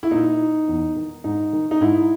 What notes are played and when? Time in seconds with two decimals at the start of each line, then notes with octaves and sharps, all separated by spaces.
0.03 E4
0.11 A#2 D#4
0.68 E2
0.96 D#3
1.24 G#2 D#4
1.53 D#3
1.71 D#4
1.81 G#2 E4